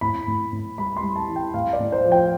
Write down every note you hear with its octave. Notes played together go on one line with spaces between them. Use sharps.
A2 B5
A2
A2
G3 B5
C6
G3
A5
E3
G5
A2 F5
D5
A2
C5
F3
G5